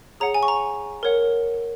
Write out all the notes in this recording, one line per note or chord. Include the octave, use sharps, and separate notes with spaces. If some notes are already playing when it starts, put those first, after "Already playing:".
G#4 C#5 F#5 A#5
G#5
C#6
A#5
A#4 C#5 F#5